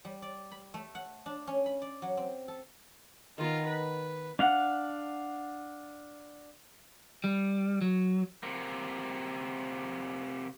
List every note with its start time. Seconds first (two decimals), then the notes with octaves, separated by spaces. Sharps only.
0.05 G3
0.22 D5
0.51 B5
0.74 A3
0.95 F#5
1.26 D4
1.47 C#4
1.66 B5
1.82 D5
2.02 F#3
2.17 C4
2.48 A4
3.38 D#3 B3 D#4 F4
3.67 B4
4.39 D4 F5 F#5
7.24 G3
7.81 F#3
8.43 C3 A#3